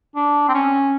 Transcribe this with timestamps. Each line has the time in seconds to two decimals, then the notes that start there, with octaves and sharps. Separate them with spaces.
0.16 D4
0.49 C4
0.54 C#4